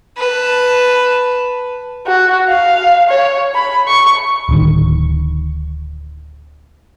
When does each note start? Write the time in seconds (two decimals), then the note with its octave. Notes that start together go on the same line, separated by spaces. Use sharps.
0.17 B4 A5
2.07 F#4
2.49 F5
3.09 C#5
3.55 B5
3.88 C#6
4.49 D1 D#3